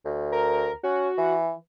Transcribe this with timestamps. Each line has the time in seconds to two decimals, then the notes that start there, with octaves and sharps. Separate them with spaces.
0.05 D2
0.32 A#4
0.83 C#4 F#4
1.18 E3